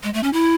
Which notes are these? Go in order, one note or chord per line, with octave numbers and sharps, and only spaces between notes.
G#3
A3
C#4
E4